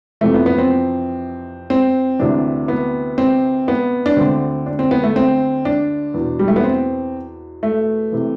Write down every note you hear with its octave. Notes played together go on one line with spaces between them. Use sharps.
F2 C3 E3 A3
B3
B3
C4
C4
D2 C3 E3 D4
B3
C4
B3
D4
D2 D3 C4
D4
C4
B3
A3
C4
D4
E2 B2
G3
A3
B3
C4
A3
C3 E3